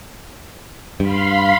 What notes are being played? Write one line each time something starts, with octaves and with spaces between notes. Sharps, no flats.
G2 F5 B5 C6